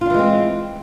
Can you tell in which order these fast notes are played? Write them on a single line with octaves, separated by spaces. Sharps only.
F4 D4 E3 G#3 C4